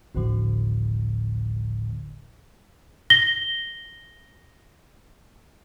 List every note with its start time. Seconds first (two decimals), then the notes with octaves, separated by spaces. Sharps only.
0.15 G#1 D2 A2 D3 F3
3.10 A#6 G7